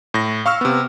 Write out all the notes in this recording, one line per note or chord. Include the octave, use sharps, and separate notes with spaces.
A2 A#6
F5 C#6 E6 F6
C3 B3